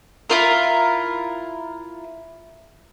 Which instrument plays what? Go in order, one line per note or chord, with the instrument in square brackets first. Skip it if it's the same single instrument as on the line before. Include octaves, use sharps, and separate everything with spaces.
[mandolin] E4 F4 A#4